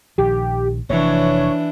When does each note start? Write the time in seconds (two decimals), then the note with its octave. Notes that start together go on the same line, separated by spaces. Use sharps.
0.18 A#1 D#3 G4
0.90 F1 E3 D4 C#5